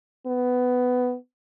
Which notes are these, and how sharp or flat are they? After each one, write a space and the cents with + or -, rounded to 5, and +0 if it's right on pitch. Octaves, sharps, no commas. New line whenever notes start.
B3 +15